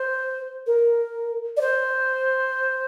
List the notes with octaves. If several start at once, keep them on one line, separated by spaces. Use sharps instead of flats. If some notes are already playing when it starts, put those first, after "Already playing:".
Already playing: C5
A#4
D5
C5